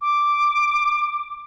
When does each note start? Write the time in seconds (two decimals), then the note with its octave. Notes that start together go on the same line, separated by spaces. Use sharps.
0.01 D6